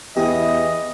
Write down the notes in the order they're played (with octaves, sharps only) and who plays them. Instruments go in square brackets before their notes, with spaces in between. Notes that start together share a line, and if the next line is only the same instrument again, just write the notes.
[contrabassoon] E2 [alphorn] E3 [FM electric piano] G4 [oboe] D#5